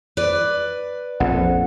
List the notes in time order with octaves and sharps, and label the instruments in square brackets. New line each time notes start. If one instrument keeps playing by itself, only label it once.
[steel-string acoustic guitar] B4 D5
[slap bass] A#1 [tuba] F2 [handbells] F#5